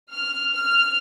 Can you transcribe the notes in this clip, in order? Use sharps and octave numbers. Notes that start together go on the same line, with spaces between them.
F6
F6